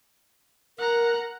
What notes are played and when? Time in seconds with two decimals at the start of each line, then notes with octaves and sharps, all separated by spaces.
0.78 A#4 F#5 A#5